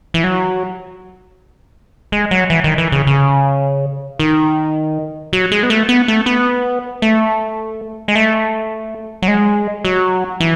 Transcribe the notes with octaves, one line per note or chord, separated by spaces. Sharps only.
E3
F#3
G#3
F#3
E3
D#3
E3
C#3
C#3
D#3
F#3
G#3
B3
A3
B3
A3
B3
A3
G#3
A3
F#3
G#3
F#3
E3